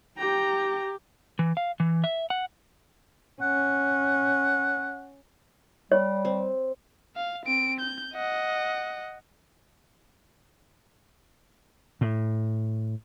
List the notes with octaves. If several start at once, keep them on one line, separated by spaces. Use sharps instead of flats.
G4 G5 A#5
E3
F5
E3
E5
F#5
C#4 F#5
G3 C#5
C4
F5
C4 D7
G6
D#5 F#5
A2